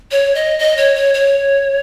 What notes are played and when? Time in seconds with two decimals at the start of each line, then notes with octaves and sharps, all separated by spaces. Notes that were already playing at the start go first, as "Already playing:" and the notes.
0.11 C#5
0.35 D#5
0.59 D#5
0.77 C#5
0.96 C#5
1.14 C#5